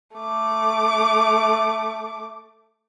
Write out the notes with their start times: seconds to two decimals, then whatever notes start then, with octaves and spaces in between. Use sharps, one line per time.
0.17 A3 D6